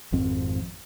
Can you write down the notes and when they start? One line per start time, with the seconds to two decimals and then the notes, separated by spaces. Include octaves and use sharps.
0.12 G#1 F2 C4